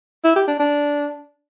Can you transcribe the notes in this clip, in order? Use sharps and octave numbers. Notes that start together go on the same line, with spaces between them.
E4
G4
D4
D4